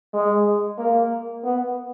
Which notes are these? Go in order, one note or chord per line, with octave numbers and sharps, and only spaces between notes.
G#3
A#3
B3